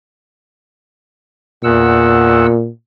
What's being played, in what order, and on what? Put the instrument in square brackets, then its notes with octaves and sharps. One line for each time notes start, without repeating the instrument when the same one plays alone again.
[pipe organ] E2 F#5 E6 [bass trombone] A#2